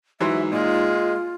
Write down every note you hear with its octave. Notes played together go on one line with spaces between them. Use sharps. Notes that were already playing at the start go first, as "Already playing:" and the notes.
G#2 E3 F#3 C5 E5
A#2 G#3 F4